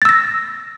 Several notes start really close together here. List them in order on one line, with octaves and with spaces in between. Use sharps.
A6 E6 A#6